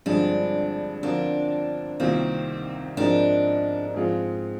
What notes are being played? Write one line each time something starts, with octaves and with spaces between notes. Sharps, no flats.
G2 D3 F3 G#3 C4 D4
D3 F3 C4 D4 F4 A#4
C2 C3 D#3 A#3 C4 F4
G#2 F3 C4 D4 D#4 A#4
G#2 F3 G#3 C4 F4